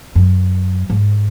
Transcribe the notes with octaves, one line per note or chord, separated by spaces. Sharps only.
F#2
G#2